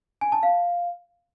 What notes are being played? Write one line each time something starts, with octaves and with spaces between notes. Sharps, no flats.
G#5
A5
F5